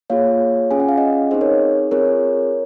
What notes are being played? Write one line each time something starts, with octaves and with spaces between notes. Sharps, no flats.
A#3 F4 G#4 C#5 F5
C#4 F4 G#4 G#5
F#5
F5
D#5 F#5
C4 D#4 G#4 C5 D#5
A#4 C#5
C4 F4 G#4 A#4 C#5